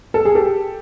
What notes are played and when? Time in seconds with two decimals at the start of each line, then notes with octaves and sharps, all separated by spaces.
0.14 A4
0.25 G#4
0.35 G4 A4